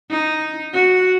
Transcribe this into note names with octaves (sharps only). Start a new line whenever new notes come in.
D#4
F#4